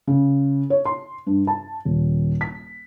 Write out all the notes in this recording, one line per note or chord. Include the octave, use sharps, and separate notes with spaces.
C#3
C#5
C6
G2
A5
D#1
B6